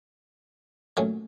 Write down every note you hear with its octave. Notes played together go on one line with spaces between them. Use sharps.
A#2 F#3 A3 C#4